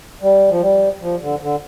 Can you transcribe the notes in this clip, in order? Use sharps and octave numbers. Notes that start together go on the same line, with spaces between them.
G3
F3
G3
F3
D3
D3